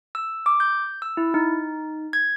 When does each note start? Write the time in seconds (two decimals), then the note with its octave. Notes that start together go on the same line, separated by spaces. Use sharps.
0.15 E6
0.46 D6
0.60 G6
1.02 E6
1.17 E4
1.34 D#4
2.13 G#6